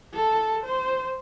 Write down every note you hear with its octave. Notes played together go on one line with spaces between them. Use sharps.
A4
C5